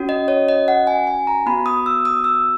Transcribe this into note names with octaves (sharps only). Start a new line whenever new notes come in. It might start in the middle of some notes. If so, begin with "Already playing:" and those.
Already playing: C#4 F#4
D#5
C#5
D#5
F#5
G#5
G#5
A#5
B3 F#4 B5
D#6
E6
D#6
E6